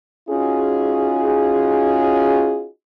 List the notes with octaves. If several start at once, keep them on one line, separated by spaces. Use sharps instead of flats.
C#4 D#4 F4 F#4 G#4